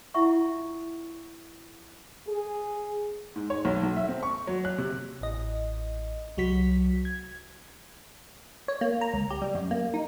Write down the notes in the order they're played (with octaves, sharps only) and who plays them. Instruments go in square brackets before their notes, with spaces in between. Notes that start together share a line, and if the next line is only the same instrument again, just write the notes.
[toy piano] E4 F4 E5 F#5 C#6
[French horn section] G#4
[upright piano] G#2
C#5
B1
B1
E5
C4
C#6
F#3
F#6
C3
[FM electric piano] A1 D#5
C2 F#3 F#4 B6
G#6
[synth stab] C#5
A#3
A#5
C#2
G4
G3
F#2
A#3
D#4